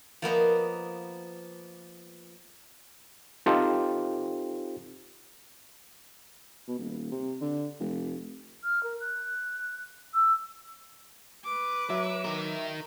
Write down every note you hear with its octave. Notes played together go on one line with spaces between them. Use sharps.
F3 A#3 B3 D#5
C4 D#4 F4 G4 A4 C5
B2
D#1
C3
D3
F1
F6
A#4
F#6
E6
B4 D6
F#3 E5
D#4 A#4